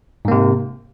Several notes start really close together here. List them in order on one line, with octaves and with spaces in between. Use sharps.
G#2 A#3 C3